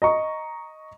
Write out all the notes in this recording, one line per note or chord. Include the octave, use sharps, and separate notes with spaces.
D#5 A#5 C#6